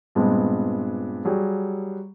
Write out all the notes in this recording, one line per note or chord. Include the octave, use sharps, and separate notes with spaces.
G2 A#2 G#3 B3 C4
F#3 G3 G#4